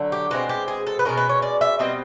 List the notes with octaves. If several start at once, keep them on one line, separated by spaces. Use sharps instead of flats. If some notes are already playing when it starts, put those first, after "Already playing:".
Already playing: D3 F#3 A3
G4
B2 G#3 C4 F#4
G4
G#4
A4
B4
B2 G#3 C#4 A#4
B4
C#5
D5
E5
B2 G3 C4 D#5